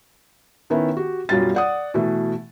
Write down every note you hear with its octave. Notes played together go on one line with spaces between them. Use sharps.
D#3 B3 C#4 E4
F#4 G4
F#2 B2 G3 F4 A6
D5 F#5 D#6
B2 E3 A3